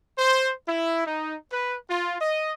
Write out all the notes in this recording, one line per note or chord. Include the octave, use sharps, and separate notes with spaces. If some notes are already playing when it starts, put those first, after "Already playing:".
C5
E4
D#4
B4
F4
D#5